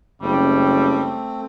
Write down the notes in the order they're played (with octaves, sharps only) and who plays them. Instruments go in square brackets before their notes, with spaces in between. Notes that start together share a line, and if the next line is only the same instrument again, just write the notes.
[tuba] F#1 [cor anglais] G3 [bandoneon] A3 C4